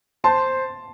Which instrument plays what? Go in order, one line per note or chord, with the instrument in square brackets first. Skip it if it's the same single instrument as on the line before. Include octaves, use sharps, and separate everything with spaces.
[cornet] C5 [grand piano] A5 C6